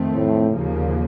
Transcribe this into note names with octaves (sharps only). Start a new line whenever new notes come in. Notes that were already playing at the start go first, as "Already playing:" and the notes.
Already playing: F2 D#3 A3 C4
A2
D#2 C#3 F3 A#3